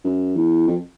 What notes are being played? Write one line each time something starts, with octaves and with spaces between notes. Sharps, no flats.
F#2
E2
F2